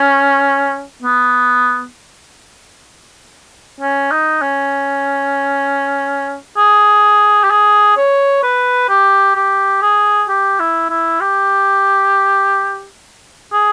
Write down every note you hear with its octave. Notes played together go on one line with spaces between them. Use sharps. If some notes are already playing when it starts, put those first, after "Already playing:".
Already playing: C#4
B3
C#4
D#4
C#4
G#4
G4
G#4
C#5
B4
G4
G4
G#4
G4
E4
E4
G4
G#4